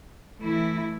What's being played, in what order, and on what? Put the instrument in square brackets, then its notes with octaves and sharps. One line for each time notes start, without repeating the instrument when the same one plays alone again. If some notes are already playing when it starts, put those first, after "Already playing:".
[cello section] E3 A3 E4